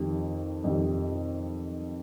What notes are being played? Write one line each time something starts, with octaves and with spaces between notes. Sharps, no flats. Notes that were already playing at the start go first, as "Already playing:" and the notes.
Already playing: F2 D#3 G3
F2 D#3 G3